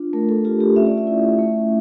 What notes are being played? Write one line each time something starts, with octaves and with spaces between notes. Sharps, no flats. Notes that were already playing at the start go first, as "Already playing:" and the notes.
Already playing: D4 F4
A3 A#4
A4
F4 G4
G4
C#4 E5
D5
E5
E4
A3